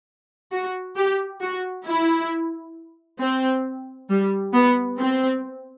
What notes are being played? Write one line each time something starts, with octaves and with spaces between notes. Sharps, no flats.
F#4
G4
F#4
E4
C4
G3
B3
C4